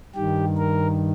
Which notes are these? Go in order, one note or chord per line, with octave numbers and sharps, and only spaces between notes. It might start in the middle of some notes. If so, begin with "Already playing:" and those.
G2 D#3 G4
A#4